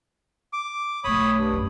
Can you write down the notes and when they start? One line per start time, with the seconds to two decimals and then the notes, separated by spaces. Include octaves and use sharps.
0.53 D6
1.04 B1 A3 C#5 B5 D#6
1.36 G2
1.53 F#2 C4